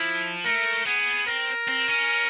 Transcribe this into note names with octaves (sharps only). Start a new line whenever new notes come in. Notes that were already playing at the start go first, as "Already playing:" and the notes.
Already playing: F3 E4
A3 A#4
B3 G#4
C4 A#4
C4
C#4